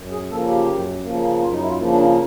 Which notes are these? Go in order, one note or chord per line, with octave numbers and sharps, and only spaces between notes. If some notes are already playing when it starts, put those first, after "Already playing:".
Already playing: F#2
G#4
C#3 F3 A#3 A4
G4
F#2
C#3 F3 A#3
F#2 F4
D#4
E4
F4
C#3 F3 A#3
D4